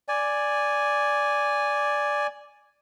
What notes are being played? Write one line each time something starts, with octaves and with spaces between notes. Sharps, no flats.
D5 G#5